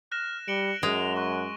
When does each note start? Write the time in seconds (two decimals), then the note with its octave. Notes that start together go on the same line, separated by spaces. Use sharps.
0.12 F6 F#6 A#6 E7
0.48 G3 C#7 D7 F#7 G7
0.83 F#2 G#3 F7
1.16 C#6 F#6